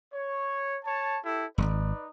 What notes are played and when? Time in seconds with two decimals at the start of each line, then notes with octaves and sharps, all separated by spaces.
0.13 C#5
0.85 C#5 A5
1.24 E4 G4 A4
1.58 D#1 G#1 D#4 B4 D5